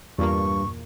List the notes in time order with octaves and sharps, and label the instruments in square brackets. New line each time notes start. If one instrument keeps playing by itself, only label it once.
[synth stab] E2 A#2 A#3 [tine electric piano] G2 [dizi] C#6